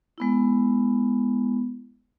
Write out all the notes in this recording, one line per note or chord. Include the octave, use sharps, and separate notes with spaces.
G#3 B3 E4